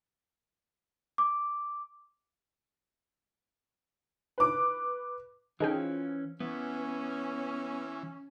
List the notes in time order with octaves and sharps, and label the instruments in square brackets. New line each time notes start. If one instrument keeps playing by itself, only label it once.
[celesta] D6
[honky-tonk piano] B4 D6
[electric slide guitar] E3 C#4 [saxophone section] F3 [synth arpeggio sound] D#4 G#4 G5
[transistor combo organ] E3 [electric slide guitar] B3 [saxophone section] C#4